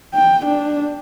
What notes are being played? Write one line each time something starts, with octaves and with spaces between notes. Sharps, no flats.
G5
D4